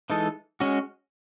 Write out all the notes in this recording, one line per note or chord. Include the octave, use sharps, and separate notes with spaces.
E3 G#3 D#4 A4
G#3 C#4 F#4